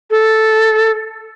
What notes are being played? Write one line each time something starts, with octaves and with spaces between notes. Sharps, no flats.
A4